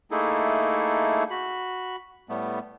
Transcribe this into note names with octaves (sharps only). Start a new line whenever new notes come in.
A3 A#3 D#4 E4 G#4 A4
F#4 B5
A2 G3 A3 B3